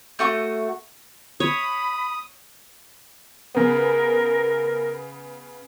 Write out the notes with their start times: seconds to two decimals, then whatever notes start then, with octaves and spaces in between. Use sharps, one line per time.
0.19 A3 F#4 C#6
1.40 C#5 B5 D#6
3.55 C#3 B3 A#4